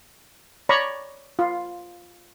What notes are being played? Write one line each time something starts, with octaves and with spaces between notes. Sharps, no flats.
C#5 D5 A#5 B5 C#6
F4